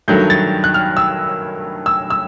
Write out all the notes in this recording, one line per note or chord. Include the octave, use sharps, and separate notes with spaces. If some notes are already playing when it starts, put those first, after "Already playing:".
G2 D#3 F#3 A3 G6
A6
F#6
F6
E6
E6
E6